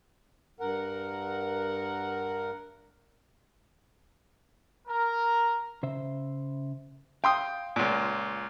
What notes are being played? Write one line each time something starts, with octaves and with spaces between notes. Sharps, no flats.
G2 A#4 F#5
A#4
C#3 C5 E5
F5 G5 C6 D#6
C#2 A#2